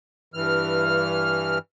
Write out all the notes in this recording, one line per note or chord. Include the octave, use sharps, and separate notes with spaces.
G2 E3 F6